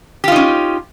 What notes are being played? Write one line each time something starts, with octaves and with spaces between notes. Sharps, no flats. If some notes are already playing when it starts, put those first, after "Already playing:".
C#4 D#4 F4 G4